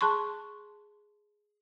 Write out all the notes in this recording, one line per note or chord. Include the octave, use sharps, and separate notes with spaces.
G#4 A5 C6 C#6